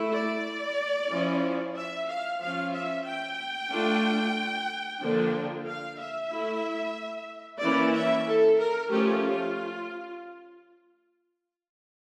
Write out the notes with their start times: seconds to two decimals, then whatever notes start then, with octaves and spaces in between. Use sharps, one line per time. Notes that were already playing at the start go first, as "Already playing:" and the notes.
Already playing: A3 E4
0.12 D5
1.10 F3 C#4 E4
1.75 E5
2.07 F5
2.40 F3 C#4 F4 F5
2.73 E5
3.06 G5
3.70 A3 D4 F4
5.00 D3 F3 A#3 D4
5.66 F5
5.98 E5
6.30 A3 E4
7.61 E3 A#3 C#4 E4 D5
7.93 E5
8.26 A4
8.59 A#4
8.90 F3 A3 C#4 F4 G4
9.24 F4